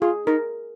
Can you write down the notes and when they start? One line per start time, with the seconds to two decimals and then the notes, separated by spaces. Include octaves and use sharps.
0.01 F4 G#4
0.27 D#4 A#4